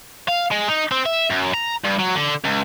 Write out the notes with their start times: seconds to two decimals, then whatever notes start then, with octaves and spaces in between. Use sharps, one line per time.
0.28 F5
0.52 G#3
0.69 D#4
0.92 C4
1.06 E5
1.30 F#2
1.54 A#5
1.84 G2
1.99 F#3
2.15 D3
2.44 C#2